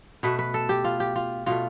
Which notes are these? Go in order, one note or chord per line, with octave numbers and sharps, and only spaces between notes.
B2 A3 B4
B4
A4
G4
F4
G4
F4
B2 A3 F4